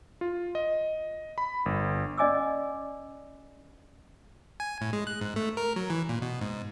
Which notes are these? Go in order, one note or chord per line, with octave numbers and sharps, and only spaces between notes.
F4
D#5
B5
G1
C#4 D5 D#5 G#5 D6 E6
G#5
A2
G#3
F#6
G#2
A3
A#4
F#3
E3
A#2
B2
G#2